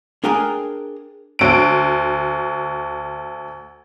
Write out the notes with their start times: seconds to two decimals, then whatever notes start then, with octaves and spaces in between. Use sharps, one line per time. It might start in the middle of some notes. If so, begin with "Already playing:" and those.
0.24 D4 G#4 A#4 G5 G#5 A#5
1.39 D2 D7